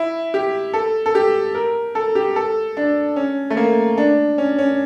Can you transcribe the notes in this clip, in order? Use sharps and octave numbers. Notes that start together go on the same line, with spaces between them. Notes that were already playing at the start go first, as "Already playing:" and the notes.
Already playing: E4
G4
A4
A4
G4
A#4
A4
G4
A4
D4
C#4
A3
A#3
D4
C#4
C#4